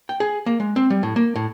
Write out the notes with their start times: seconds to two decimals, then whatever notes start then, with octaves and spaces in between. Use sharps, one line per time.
0.09 G5
0.20 G#4
0.46 A#3
0.60 G#3
0.76 C4
0.90 G3
1.03 A2
1.16 A#3
1.36 A2